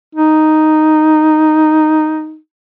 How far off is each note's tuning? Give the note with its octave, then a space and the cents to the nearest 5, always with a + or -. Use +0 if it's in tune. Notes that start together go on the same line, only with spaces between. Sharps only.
D#4 +0